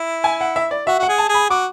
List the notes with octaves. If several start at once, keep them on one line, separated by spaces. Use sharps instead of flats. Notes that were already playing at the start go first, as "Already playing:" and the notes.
Already playing: E4
G#5
F#5
E5
D5
F#4 E5
F#4 F#5
G#4
A5
G#4
B5
F#4 D6